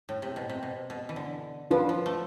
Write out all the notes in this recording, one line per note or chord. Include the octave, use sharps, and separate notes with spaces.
A2
C3
B2
C3
B2
B2
E3
D3
F3 D4 F4 B4
F3
A3